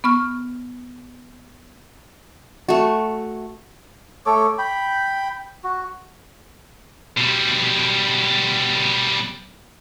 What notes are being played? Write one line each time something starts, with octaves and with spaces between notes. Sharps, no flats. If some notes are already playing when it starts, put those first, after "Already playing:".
B3 C#6 F6
A3 F#4
A3 A4 C#5 D6
G5 B5
F#4
B2 G3